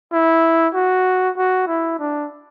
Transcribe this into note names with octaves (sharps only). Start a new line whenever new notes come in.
E4
F#4
F#4
E4
D4